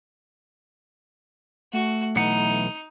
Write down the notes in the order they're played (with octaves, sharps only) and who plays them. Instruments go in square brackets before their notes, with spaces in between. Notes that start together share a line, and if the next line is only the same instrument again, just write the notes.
[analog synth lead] A3 [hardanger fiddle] F#4
[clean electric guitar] B1 E3 F#5 [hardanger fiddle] D#4